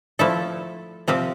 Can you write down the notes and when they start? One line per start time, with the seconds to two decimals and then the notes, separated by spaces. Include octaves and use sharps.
0.19 F3 A3 E4 A4
1.08 C3 F3 C4 G4